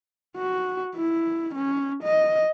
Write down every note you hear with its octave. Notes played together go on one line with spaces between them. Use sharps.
F#4
E4
C#4
D#5